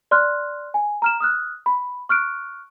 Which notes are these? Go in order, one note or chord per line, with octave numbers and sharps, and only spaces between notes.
D5 C6 F6 F#6
G#5
A#5 F6 E7
D#6 F6 F#6
B5
C#6 F6 F#6 D7